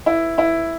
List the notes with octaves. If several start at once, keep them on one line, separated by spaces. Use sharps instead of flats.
E4
E4